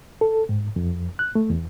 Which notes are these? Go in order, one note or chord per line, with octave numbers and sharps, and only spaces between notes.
A4
G#2
F2
F#6
A3
E2